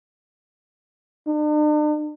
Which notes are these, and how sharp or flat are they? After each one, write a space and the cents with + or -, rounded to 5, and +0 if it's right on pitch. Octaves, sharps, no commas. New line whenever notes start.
D4 +45